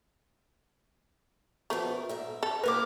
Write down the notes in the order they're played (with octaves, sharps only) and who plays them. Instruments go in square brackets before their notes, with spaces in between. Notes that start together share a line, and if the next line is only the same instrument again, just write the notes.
[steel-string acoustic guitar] F3 B3 A#4 [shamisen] A3
[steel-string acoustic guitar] G#2 A#4 E5
[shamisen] A4
[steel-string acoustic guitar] C3 A#3 E4 [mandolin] A#4 D6 [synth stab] B4